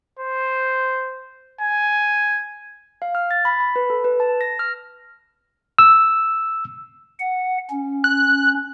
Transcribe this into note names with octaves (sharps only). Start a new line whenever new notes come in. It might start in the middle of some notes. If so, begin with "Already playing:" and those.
C5
G#5
F5
F6
A6
B5
B5
B4
A4
B4
A5
A#6
F6
E6
F#5
C#4
F#6